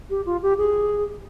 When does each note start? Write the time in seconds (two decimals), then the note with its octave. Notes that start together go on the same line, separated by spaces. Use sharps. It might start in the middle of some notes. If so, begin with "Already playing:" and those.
0.10 G4
0.26 F4
0.42 G4
0.58 G#4